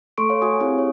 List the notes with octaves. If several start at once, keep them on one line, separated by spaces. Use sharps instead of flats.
A3 A4 C6 C#6 D7
C#5 F5
F#4 G#5 D#6
C4 E4 G4 G#4 F5
C#5